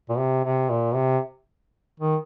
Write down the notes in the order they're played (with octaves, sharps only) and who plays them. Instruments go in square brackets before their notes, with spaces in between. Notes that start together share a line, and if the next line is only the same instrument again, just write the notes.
[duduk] A#2
C3
C3
A#2
C3
D#3